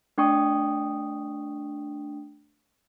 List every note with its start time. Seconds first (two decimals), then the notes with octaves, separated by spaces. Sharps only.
0.18 A3 D4 G5 C#6 D#6